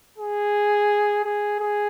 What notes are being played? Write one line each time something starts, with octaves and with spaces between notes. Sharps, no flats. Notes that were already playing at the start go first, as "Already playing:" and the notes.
G#4
G#4
G#4